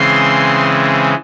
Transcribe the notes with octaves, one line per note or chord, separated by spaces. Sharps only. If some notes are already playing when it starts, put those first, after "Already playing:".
Already playing: C#3 E3 G#3 C4 C6